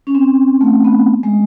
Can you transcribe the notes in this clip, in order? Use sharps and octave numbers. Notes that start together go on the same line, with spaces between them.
C#4
C4
A3
B3
G#3